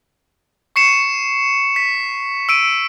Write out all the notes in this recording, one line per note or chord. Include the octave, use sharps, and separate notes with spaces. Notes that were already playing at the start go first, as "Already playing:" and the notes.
C#6 C7 C#7 E7
B6
E6 D7 D#7